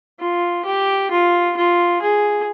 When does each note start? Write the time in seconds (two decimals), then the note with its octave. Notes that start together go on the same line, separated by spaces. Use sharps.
0.19 F4
0.65 G4
1.11 F4
1.57 F4
2.02 G#4